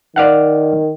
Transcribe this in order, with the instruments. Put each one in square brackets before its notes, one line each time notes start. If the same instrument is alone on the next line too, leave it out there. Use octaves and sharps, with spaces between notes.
[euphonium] D#3 [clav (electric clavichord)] D5 F5 F#5